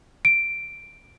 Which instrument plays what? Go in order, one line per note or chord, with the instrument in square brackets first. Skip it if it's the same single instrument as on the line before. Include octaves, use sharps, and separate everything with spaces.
[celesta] D7